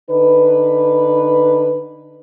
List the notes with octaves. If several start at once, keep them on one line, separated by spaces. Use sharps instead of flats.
D3 D#4 B4